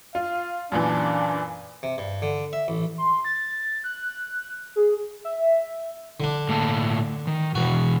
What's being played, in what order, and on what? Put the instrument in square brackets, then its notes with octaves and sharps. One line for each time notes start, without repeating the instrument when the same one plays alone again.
[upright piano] F4 [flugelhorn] F5
[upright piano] F#2 A#2 E3 [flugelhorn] D4
[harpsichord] C3
G2
D3
E5
A1
[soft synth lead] C6
A6
F#6
G#4
E5
[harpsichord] D3 D4
[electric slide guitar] A2 A#3 A5
D#3
[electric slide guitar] B2 E3 [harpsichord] F#4